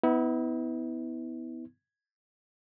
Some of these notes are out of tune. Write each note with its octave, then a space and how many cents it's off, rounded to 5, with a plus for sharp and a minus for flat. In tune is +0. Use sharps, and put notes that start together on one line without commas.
B3 +15 E4 -35